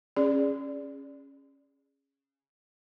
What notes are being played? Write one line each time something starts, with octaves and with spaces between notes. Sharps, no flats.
C#4 G#4 D5